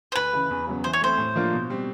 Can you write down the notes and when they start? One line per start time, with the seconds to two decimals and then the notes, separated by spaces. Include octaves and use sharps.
0.12 C5
0.16 D2 B4
0.33 C#3 E3
0.51 E2
0.67 C#3 F#3 B3
0.84 E3 C5
0.93 C#5
1.01 A3 C4 C5
1.18 A2
1.35 F3 A#3 D4 F4
1.52 B2
1.70 G3 C4